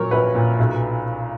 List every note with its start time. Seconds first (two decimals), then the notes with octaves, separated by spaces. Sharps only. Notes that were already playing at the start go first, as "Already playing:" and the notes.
Already playing: A#2 F#3 A#4 C#5
0.11 A#1 B4
0.35 A#2
0.59 B1